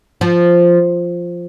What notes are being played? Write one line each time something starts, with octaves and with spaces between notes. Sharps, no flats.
F3